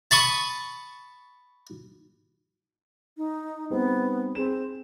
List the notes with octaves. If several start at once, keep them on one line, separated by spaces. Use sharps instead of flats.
A5 B5 C#6 D#6
D#4
G3 B3 C4 D#4
C4 G#4 E7